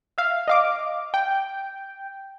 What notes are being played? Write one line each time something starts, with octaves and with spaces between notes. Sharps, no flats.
E5 F5
D#5 F5 D6
G5